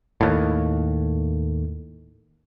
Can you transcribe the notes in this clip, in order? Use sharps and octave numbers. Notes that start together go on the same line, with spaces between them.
D#2 A2